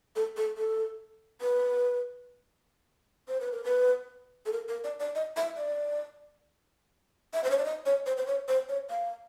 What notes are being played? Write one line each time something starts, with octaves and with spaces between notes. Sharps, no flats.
A4
A4
A4
B4
C5
B4
A#4
B4
A4
A#4
A#4
D5
D5
D#5
E5
D5
E5
C5
C#5
D5
D#5
C#5
C5
C5
C#5
C5
C#5
F5